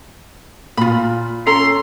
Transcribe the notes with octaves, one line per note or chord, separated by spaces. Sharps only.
A#2 F4 B5
C#4 A4 A#5 C6